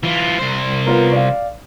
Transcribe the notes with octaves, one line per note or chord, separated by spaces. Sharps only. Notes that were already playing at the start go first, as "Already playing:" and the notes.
E3 F4
C2 C5
B3 F4 A#4
D5 F5